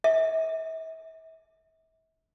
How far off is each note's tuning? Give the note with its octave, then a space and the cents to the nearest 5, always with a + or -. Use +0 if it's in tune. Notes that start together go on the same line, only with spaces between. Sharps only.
E5 -40